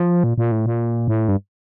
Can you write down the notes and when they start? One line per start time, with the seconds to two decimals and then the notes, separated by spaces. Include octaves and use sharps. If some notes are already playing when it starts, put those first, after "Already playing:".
Already playing: F3
0.24 A#2
0.38 A#2
0.51 A2
0.66 A#2
1.08 A2
1.29 G2